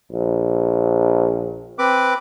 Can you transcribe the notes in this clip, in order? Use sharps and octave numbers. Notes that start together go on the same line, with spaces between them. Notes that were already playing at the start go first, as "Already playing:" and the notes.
A#1
C4 B4 D6